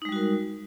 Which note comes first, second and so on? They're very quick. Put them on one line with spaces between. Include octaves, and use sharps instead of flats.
D#4 G#3 G3 F#4 A#4